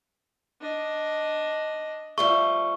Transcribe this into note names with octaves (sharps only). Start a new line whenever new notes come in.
D4 D#5
F3 G3 A3 C#6